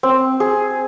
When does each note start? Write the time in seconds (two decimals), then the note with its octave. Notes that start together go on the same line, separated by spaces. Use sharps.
0.03 C4
0.40 G#4